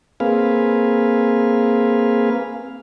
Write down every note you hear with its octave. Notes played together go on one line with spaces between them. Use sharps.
A#3 C4 G#4 B4 F5